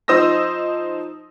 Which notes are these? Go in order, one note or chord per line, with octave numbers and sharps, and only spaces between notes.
F3 D#4 C5 D#6 E6 A#6